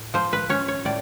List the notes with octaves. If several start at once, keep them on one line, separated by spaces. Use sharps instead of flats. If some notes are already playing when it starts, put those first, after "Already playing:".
Already playing: A2
F3 C5
B4
C#4 C#5
C#5
A2 D5